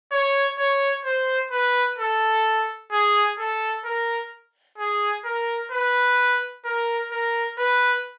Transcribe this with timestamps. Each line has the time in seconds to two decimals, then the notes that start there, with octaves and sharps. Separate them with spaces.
0.12 C#5
0.58 C#5
1.05 C5
1.52 B4
1.98 A4
2.92 G#4
3.39 A4
3.85 A#4
4.78 G#4
5.25 A#4
5.72 B4
6.65 A#4
7.11 A#4
7.59 B4